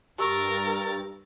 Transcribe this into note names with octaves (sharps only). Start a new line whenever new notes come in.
G2 G4 A#4 C#6 E6 A6